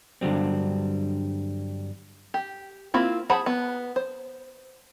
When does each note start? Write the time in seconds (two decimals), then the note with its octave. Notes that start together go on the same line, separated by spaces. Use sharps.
0.21 G2 D3 F#3 G3 C4
2.34 G4
2.94 A#3 C4 E4 F4
3.30 G#4 C5 F#5 A5 B5
3.46 B3
3.96 C5